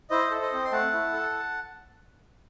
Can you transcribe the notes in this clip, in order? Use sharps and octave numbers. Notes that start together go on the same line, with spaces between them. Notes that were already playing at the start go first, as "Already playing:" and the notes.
E4 C5 D#5
A4
C5 D#5
C4
C6
A3 F#5 A5
E4
A4